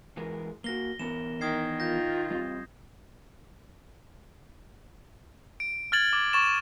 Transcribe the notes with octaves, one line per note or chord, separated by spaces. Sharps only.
E3 G#3 A#4
A#3 F#4 A#6 G7
E3 B3 A#4 E7
D#3 D#6 G#6 C7
F4 G6 A#6
G3 C4 D#5
D7
F6 G#6 A6 F#7
D6
C#6 A6 E7